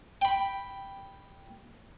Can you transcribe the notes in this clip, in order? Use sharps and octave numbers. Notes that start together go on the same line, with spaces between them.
G5 B5